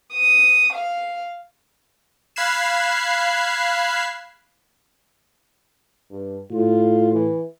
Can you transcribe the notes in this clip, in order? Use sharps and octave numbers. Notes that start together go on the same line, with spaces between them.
D#6
F5
F5 B5 F#6 G#6 C7 E7
G2
A2 F4
E3